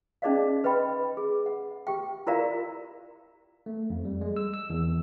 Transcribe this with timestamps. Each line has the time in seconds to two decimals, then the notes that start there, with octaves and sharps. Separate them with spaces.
0.22 C#4 D#4 G#4 D5 D#5 F5
0.64 B4 D#5 G5 B5
1.17 G#4
1.46 F#5
1.87 G4 G5
2.27 E4 F4 A#4 D5 F5 A#5
3.66 A3
3.90 F2
4.05 G3
4.21 G#3
4.36 E6
4.54 E6
4.70 E2